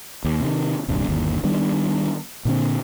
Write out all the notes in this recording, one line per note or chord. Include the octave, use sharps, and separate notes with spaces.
D#2
C3 D#3
D#1 C2 G2
G1 D#2
D#3 G3 B3 D4
A#2 D3 C4